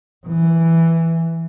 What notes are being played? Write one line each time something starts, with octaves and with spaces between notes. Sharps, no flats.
E3